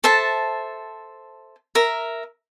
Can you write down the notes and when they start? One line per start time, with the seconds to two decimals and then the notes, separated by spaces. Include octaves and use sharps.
0.04 A4 C5 E5 A5
1.75 A#4 E5 A#5